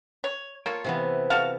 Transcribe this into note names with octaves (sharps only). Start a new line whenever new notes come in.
C#5
A#3 F4 A4 C#5
C3 E3 B3
F#4 A4 F5